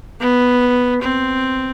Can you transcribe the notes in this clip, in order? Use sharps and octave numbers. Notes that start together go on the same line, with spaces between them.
B3
C4